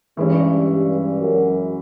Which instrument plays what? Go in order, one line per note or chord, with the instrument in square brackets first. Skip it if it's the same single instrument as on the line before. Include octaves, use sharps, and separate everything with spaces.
[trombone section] G2 [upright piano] E3 G#3 C#4
[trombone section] G2
F#2